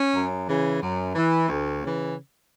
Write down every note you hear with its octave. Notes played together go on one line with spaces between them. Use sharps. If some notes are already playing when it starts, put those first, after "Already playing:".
Already playing: C#4
F#2
C#3 E3
F#2
E3
D2
C#3 E3